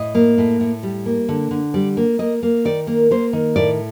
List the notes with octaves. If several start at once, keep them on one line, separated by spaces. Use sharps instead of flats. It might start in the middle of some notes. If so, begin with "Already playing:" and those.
Already playing: A2 D#5
A#3
A2
A2
G3
A#3
D3
D3
G3 D5
A#3
A#3 D#5
A#3
D#3 D5
A#3
A#3 C5
D#3
A2 D5